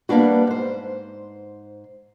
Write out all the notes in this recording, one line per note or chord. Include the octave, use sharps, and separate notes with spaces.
G3 A#3 B3 D4 F#4
G#2 C5